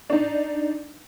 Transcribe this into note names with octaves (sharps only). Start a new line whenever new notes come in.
D4 D#4